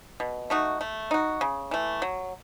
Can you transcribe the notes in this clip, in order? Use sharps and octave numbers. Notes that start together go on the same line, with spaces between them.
B2
A3 D#4 F#4
A3
D#4 F#4
C#3
E3 A3
F#3